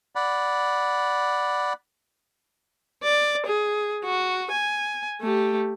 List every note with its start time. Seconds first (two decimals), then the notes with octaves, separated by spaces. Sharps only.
0.16 D5 F#5 B5
3.04 D5
3.47 G#4
4.05 F#4
4.52 G#5
5.21 A3 G4